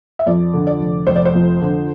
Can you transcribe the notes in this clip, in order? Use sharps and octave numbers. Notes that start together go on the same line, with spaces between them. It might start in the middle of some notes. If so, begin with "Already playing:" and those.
E5
F2 D5
D3
D5
F1
F1 C5
D5
C5
F2
D3